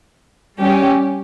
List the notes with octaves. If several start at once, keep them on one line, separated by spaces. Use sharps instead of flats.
G3 C#4 G4